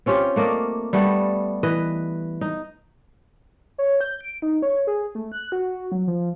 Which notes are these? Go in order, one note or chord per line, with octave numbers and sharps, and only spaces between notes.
C4 C#4 F4 G4
A3 A#3 D5 D#5
G3 A3 B3
E3 B4 D#5
D#4
C#5
G6
D7
D#4
C#5
G#4
A3
F#6
F#4
F#3
F3